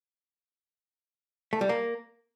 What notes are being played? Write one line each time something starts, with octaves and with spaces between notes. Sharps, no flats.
A3
G3
A#3